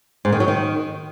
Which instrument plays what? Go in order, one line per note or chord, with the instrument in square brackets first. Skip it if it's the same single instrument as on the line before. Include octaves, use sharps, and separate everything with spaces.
[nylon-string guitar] G#2
D#3
F#3
D#3